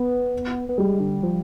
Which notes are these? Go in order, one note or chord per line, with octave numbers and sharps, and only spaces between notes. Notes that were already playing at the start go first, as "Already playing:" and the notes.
Already playing: B3
B3
G3 G#3
D3
F3